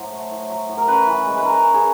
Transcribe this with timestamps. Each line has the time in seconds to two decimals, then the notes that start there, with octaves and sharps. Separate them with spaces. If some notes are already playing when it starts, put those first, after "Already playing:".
Already playing: A2 F#3 C5
0.12 A3
0.31 A2
0.50 F#3
0.69 A2
0.77 A#4
0.88 C#4 B4
1.07 E3
1.26 G#3
1.37 B4
1.45 E3 A#4
1.64 C#4
1.74 G#4